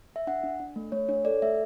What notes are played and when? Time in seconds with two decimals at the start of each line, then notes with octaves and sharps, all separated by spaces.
0.16 E5
0.27 D4 F#5
0.44 D4
0.60 D4
0.76 A3
0.92 A3 C#5
1.09 D4 C#5
1.25 A4 D5
1.42 A3 E5